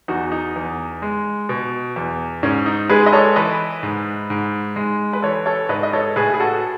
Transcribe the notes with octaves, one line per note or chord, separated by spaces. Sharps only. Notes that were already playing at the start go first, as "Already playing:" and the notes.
E2 D#4 F#4
D#4
E2
G#3
B2
E2
G#2 C#4
D#4
G#3 G#4 B4
D#5
A4 C#5
E3 B4 D#5
G#2
G#2
G#3
B4
E3 A4 C#5
A4 C#5
G#2 B4 D#5
D#5
A4 C#5
A2 G#4 B4
G#4
F#4 A4